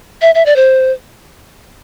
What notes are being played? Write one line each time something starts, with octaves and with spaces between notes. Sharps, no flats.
E5
E5
D5
C5